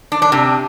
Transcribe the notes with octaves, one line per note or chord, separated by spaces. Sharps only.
D4
D4
C3